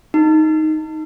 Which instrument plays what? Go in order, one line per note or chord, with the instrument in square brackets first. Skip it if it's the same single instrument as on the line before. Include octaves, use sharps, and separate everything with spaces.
[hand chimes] D#4